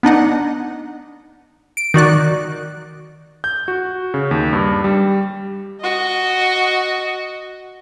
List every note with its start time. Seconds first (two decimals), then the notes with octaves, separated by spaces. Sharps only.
0.03 B3 D4 D#4 F#5
1.77 D7
1.94 D#3 F#4 D5 F#6
3.44 G6
3.68 F#4
4.14 C#3
4.31 D#2
4.53 G2
4.84 G3
5.81 F#4 D#5